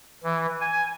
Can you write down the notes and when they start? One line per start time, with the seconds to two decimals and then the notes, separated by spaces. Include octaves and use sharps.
0.23 E3
0.60 G#5